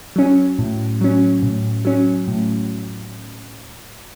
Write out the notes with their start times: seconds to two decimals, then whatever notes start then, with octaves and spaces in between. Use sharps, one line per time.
0.16 F#3 C#4
0.59 A2
1.01 F#3 C#4
1.43 A2
1.85 F#3 C#4
2.28 A2